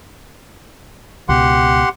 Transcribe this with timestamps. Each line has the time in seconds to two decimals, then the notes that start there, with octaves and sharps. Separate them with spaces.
1.29 C#2 B2 G4 F#5 C6